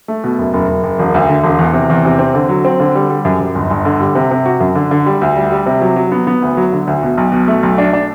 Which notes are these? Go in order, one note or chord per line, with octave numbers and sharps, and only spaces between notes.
A3
B2
F#1
F#1
F#1
F#1
E1
D2
D3
E1
E2
C3
E2
C3
C4
D3
F#3
C4
D3
G3
G3
F#2
F#2
G1
G1
D3
G3
C3
C3
F#4
F#2
D3
D3
G3
D2
G3
G3
C3
F#3
F#3
B3
B3
D2
F#3
D3
D2
B2
B1
B2
A3
B1
D4
D4